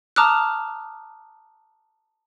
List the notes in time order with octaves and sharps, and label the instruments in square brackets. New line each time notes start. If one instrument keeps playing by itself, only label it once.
[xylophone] A5 A#5 D6 D#6 F6 F#6